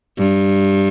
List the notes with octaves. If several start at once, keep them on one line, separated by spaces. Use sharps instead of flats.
G2